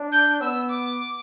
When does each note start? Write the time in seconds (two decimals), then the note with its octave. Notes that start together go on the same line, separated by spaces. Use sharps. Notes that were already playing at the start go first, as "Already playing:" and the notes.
Already playing: D4
0.12 G6
0.41 B3 E6
0.69 D6